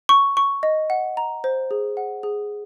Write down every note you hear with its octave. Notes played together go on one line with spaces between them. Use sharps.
C#6
C#6
D#5
F#5
A#5
C5
G#4
F#5
G#4